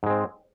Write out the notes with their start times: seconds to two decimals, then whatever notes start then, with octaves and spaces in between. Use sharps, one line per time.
0.03 G#2
0.06 G#3
0.10 C4